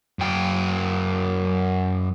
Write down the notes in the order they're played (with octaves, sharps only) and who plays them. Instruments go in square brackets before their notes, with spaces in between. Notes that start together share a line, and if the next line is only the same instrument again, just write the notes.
[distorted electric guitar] F#2 G5